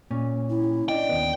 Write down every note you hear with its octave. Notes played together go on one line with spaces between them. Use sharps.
A#2 C#4
E4
D4 D#5 G5
D#2 B3